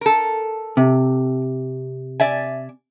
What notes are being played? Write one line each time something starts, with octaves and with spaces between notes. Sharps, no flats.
A4 A#4
C3
D5 E5 G#5